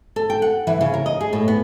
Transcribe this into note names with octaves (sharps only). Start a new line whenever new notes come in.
A4
G5
F#5
E3
C#3
A#4
D#5
G#4
A2
B3